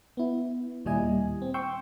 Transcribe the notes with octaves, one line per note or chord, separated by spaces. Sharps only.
B3 E4
D#2 A#2 G3 E4 D#5 G#5
C4
G5 C6 C#6 E6 G6